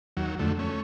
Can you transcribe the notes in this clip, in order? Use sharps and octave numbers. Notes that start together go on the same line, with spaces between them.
D#2 F#3
F2 D3 A3
A3 C#4